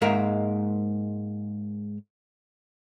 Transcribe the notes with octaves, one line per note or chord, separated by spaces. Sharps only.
G#2 G#3 A#3 A#4 E5